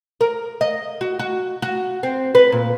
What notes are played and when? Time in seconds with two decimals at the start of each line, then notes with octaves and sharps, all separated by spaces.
0.21 A#4
0.61 D#5
1.01 F#4
1.19 F#4
1.62 F#4
2.03 C4
2.35 B4
2.52 A#2